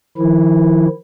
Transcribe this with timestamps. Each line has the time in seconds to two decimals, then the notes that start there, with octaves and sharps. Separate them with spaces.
0.17 D#3 F3 E4